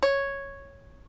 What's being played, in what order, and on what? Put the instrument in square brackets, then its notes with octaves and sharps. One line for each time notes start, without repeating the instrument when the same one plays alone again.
[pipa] C#5